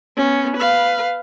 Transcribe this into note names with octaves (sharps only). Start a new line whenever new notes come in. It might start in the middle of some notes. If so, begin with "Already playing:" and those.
B3 C#4
B4 F5